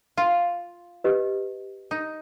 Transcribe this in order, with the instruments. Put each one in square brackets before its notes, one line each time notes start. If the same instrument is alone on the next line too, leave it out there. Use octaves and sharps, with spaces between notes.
[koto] F4
[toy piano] G4 B4 D#5
[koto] D#4